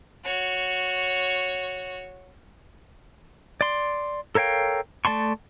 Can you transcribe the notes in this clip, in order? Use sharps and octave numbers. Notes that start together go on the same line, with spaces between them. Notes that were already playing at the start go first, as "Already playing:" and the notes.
F#4 C#5
D5 C6
A4 A#4 C#5 F5 G5
A3 D5 A5 C6 C#6